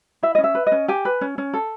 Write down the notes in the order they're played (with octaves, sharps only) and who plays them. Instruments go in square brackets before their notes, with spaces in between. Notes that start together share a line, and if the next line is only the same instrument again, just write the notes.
[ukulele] E4 E5
C#4 D#5
E5
B4
D#5
C#4
G4 G#5
B4
C#4
C#4
A4